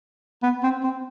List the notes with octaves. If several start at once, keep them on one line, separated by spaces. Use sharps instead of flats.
B3
C4
C4